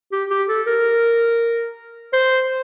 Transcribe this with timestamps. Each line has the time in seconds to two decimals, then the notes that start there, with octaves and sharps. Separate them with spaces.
0.12 G4
0.30 G4
0.49 A4
0.67 A#4
2.13 C5